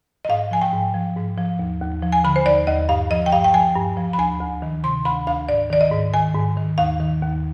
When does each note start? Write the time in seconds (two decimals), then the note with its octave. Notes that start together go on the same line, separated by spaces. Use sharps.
0.25 D#5
0.29 G#2 F5
0.51 F3 G#5
0.62 G5
0.73 G#2
0.94 F3
1.16 G#2
1.38 F3
1.59 D#2
1.81 D#2
2.02 F3
2.12 G#5
2.24 D3 B5
2.36 C5
2.46 D#2 D5
2.67 D#2 D#5
2.89 G2 F5
3.10 F3 D#5
3.26 G5
3.32 G2 F5
3.44 G5
3.54 F3 G#5
3.75 G2
3.97 F3
4.13 B5
4.19 D2 G#5
4.40 D2
4.62 D#3
4.84 C3 C6
5.05 D2 B5
5.27 D2 F5
5.48 G#2 D5
5.70 D#3 D5
5.81 D#5
5.92 G#2
6.14 D#3 G#5
6.35 G#2
6.57 D#3
6.78 D#2 F5
7.00 D#3
7.22 D#2